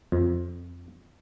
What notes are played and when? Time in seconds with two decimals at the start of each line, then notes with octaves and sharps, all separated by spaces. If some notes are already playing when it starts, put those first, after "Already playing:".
0.12 F2